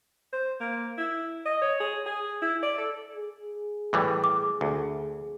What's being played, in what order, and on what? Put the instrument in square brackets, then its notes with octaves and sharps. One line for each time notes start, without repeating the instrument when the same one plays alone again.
[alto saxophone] C5
A#3
E4
D#5
C#5
G#4
G#4
E4
D5
A4
[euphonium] G#4
[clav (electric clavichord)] A2 E3 G3
[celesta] D6
[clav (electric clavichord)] D2